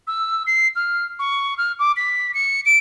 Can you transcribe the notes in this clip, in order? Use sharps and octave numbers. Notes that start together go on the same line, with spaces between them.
E6
C7
F6
C#6
F6
D6
B6
C#7
D7